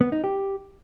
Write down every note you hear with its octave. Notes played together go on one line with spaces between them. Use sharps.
B3
D#4
G4